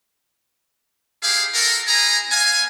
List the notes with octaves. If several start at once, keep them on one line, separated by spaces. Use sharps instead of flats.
E4 G4 G#4 F5
F#4 A4 A#4
E4 G#4 G#5 A#5
B3 F5 G#5